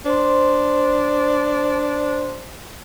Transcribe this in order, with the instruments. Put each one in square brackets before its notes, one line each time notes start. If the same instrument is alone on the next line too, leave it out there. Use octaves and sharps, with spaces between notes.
[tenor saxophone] D4 [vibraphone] C5 C6